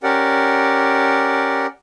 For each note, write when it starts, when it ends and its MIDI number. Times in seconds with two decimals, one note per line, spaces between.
0.03 1.66 61
0.03 1.66 67
0.03 1.66 70
0.03 1.66 74
0.03 1.66 78